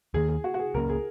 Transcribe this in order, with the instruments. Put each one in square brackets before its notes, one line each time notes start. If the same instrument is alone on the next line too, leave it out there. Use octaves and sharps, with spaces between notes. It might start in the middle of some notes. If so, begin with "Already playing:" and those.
[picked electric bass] D#2 D#3 A#3 [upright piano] G#4
[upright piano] G#4
F#4
F#4
G#4
[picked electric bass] C#2 C#3 A#3 C#4 [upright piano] A#4
[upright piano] G#4